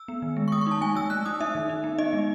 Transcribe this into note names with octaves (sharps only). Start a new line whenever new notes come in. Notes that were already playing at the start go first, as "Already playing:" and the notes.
Already playing: E6
B3
D#3
G#3
C#6
G#3 D#6
C#6
D#4 A5
G#3 G#5
G#3 E6
A3 F#6
D#4 D#6
D#4 E5
D#3
D#4
B3
D#4 D#5
G#3